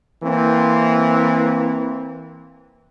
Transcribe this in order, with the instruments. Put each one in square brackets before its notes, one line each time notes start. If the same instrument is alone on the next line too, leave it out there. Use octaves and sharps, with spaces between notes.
[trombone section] E3 A#3 C4